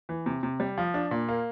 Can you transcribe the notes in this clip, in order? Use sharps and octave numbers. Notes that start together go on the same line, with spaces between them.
E3
C3
C3
G3
F3
D4
A#2
A#3